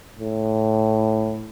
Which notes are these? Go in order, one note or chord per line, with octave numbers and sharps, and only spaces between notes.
A2